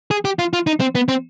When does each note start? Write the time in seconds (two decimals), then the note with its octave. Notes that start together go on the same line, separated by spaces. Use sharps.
0.11 G#4
0.25 G4
0.39 F4
0.53 F4
0.67 D#4
0.80 C4
0.95 B3
1.08 C4